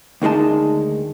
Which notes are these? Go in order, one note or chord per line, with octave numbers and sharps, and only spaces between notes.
D2 D#3 G#3 D#4 A5